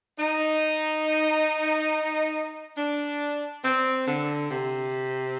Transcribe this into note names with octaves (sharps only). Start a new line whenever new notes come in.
D#4
D4
C4
D3
C3